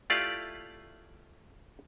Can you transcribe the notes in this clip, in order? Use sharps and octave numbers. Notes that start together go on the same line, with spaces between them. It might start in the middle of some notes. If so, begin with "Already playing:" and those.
A3 E4 F4 G4 D5 F5